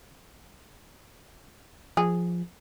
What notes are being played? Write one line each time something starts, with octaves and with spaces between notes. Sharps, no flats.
F3 G#4